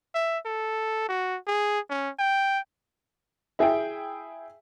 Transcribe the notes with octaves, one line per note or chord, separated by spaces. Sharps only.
E5
A4
F#4
G#4
C#4
G5
E4 G#4 E5 G5